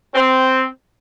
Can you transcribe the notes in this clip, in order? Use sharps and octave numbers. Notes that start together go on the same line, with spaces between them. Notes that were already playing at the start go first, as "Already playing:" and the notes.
C4